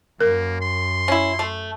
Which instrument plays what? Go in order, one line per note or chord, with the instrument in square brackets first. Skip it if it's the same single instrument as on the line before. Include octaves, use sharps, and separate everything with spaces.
[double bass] F#2 [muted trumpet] A#3 [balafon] A#4
[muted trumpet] C6
[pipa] C#4 E4
A3